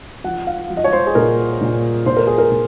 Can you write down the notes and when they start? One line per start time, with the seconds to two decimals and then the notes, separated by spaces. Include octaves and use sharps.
0.24 F3 F#5
0.47 F5
0.70 F3
0.77 D#5
0.84 C#5
0.93 C5
1.07 G#4
1.15 A#2 A#4
1.61 A#2
2.06 A#2 C5
2.17 A#4
2.27 G#4
2.38 A#4
2.51 A#2